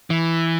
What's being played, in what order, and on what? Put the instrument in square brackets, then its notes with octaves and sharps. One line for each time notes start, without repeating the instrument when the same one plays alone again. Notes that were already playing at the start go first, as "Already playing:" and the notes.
[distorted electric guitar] E3